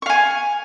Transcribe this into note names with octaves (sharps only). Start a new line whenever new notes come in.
F5 G#5 C#6